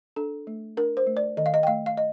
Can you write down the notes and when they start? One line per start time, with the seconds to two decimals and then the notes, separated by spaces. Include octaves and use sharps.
0.16 D4 A4
0.47 A3
0.77 D4 A#4
0.97 C5
1.07 A3
1.17 D5
1.37 D#3 D#5
1.46 F5
1.54 D#5
1.63 G5
1.67 A3 F5
1.86 F5
1.97 D#5